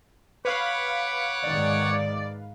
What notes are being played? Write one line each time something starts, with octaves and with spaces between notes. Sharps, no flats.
B4 C#5 F5 F#5 B5 D6
G#2 D#3 D5